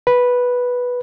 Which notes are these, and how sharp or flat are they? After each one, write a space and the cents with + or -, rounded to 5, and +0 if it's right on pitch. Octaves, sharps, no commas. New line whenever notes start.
B4 -5